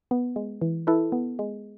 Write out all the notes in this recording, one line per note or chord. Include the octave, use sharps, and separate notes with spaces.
B3
G#3
E3
E4 A4 B4
B3
G#3